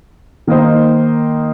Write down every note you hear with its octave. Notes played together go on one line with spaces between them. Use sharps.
D#3 A#3 D#4 C5